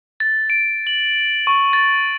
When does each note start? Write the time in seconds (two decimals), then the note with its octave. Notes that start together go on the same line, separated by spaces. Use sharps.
0.20 A6
0.50 D7
0.87 F#7
1.47 C#6
1.73 A6